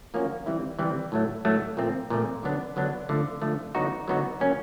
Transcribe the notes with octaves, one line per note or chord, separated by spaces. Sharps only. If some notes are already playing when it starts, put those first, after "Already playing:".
F3 A#3 C#4 F#4
E3 G3 C4 E4
E3 G3 C4 E4
A2 F#3 A3
A2 F#3 A3
A#2 F3 A3 C4
A#2 F3 A3 C4
D3 F#3 B3 D4
D3 F#3 B3 D4
D3 F3 A3
D3 F3 A3
D3 F#3 B3 D#4 F#4
D3 F#3 B3 D#4 F#4
F#3 A#3 C#4